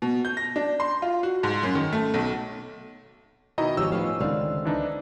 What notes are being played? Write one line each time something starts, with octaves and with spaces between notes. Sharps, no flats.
B2
G6
A#6
D4
C6
F4
F#4
G#2
F#2
D#3
A3
B1
B2 D#3 E4 D#5 A#5
G#1 F3 C#4 G4 E6
A2 F3 B3 C#4 F5
C#2 D3 D#3 C4 F5
E3 D4 D#4